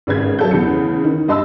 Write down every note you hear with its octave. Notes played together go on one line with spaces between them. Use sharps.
G#1 C#3 B4 G#6
F#3 A4 G6
E2 C#3 C#7
D#3
G2 D#5 A5 C6 E6